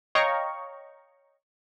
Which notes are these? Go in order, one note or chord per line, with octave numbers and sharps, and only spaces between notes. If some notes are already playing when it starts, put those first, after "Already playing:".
C#5 D#5 F5 G5 A#5 C#6